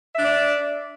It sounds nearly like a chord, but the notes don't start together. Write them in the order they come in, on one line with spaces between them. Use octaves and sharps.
E5 D4 D5